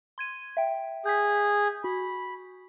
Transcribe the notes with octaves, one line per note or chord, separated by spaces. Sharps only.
C6 G#6 D#7
E5 G5
G#4 G6 B6
F#4 B5